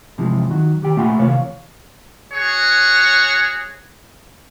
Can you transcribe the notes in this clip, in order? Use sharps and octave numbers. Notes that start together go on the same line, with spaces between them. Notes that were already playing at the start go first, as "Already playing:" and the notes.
G2 C3 E3 F3 G#3
D#3 F#3 F#4
D#3 G4 G5
A#2 A3 F4 F#5 G#5 B5
D#2 C3 E3 A#4 C#5 F5
F#4 G#4 C#5